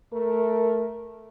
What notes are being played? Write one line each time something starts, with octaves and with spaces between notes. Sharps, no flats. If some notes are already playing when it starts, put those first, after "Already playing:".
A3 A#4